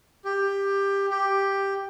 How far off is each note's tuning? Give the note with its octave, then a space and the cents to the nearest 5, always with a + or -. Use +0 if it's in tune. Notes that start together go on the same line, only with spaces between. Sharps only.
G4 +15
G4 +5